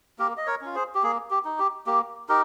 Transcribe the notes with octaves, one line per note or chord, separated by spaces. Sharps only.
A#3 G4 A#4
D#5
A#4 C#5
C#4 F4
G#4 C5
G4
A#3 G#4
G4
D#4
G4
A#3 G4
D#4 G4 A#4